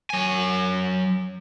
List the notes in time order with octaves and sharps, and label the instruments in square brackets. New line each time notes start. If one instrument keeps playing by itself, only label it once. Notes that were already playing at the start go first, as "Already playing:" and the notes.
[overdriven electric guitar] F#3 G#5